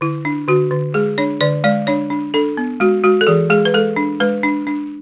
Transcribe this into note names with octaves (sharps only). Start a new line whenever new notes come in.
D3 E4
D4
D3 F#4
D3
G#3 G#4
D4 C#5
D3 D5
G#3 D5
D4 C#5
D4
D4 A4
B3
G#3 F#4
G#3 F#4
A4
E3 G#4
G#3 G#4
B4
G#3 A4
D4
G#3 B4
D4
D4